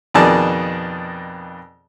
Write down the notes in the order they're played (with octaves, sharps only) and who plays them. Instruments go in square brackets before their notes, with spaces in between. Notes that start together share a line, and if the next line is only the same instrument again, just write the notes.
[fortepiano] F2 B2 D#3 G#4 D5 A5